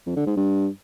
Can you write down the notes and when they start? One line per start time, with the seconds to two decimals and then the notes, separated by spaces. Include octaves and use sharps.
0.06 F2
0.16 D3
0.26 G#2
0.36 G2